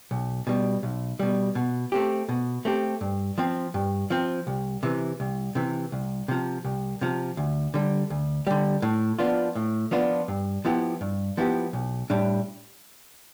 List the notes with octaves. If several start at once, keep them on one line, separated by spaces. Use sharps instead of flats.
B1
B2 G3
B1
B2 G3
B2
A3 C4 G4
B2
A3 C4 G4
G2
F3 C4
G2
F3 C4
C2
C3 E3
C2
C3 E3
C2
C3 F3
C2
C3 F3
D2
D3 G3
D2
D3 G3
A2
F3 B3 D4 F4
A2
F3 B3 D4 F4
G2
F3 B3 E4 G4
G2
F3 B3 E4 G4
B1
A2 G3 D4